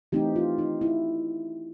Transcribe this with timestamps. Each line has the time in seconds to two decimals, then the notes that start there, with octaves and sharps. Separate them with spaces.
0.12 E3 A3 C4 D#4 G4
0.36 F4
0.58 D#4
0.81 E4